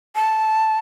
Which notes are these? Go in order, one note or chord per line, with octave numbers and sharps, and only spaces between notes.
A5